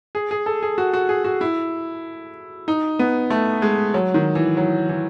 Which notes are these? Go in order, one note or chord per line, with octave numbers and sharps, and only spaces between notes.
G#4
G#4
A4
G#4
F#4
F#4
G#4
F#4
E4
D#4
B3
A3
G#3
F#3
D#3
E3
F#3
E3